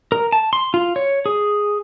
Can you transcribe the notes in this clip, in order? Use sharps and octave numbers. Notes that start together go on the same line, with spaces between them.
A#4
A5
C6
F4
C#5
G#4